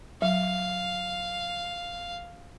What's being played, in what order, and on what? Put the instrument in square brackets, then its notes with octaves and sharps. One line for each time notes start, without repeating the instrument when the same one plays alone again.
[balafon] F#3 [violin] F5